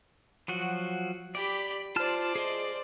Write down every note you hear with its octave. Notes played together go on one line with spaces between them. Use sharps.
F3 F#3 F#4
G4 D5 B5
F4 C5 D5 A5 F6
G#4 D#5